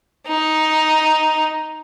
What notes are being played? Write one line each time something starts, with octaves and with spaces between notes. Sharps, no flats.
D#4